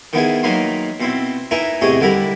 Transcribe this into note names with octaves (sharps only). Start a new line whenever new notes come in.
D#3 B3 E4 G#4
D#3 F#3 A#3 D#4 B5 C6
B2 C4 E4
D#4 E4 A#4 B4 E5 G#5
E2 A2 C3 G#4 D#5 C#6
D3 G3 E4 A#4 B5